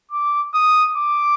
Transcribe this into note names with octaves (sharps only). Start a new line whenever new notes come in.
D6
D#6
D6